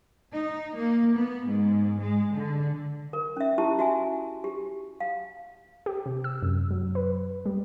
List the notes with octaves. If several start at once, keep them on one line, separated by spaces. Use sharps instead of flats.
D#4
A#3
B3
G#2
G#3
D3
A#4
C#4 E5
E4 G4 A5
F#4 E5 G#5
G4
F5
G4
C3
E6
F#2
F#3
B4
G3